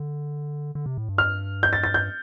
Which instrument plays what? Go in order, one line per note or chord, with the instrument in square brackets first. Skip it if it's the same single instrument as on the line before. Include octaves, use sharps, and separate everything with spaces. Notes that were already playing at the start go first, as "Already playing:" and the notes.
Already playing: [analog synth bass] D3
D3
C3
A2
G2
[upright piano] F6
G6
A6
A6
G6